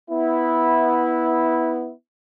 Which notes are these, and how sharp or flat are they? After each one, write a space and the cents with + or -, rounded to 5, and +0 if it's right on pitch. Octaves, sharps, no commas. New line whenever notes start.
B3 +0 E4 -10